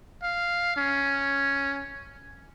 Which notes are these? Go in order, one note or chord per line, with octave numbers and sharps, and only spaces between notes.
F5
C#4